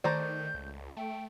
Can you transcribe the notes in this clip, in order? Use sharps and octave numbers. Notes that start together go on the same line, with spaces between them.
D#3 A3 C5 D5 A#5 G6
C#2
A3 G5